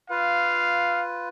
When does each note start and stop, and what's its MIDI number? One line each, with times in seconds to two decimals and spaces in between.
0.10 1.29 65
0.10 1.29 71
0.10 1.04 77